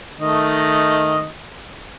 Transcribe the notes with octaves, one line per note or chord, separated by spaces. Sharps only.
D#3 A3 D#5